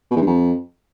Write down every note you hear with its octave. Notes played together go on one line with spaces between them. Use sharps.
B2
E2
G2
F2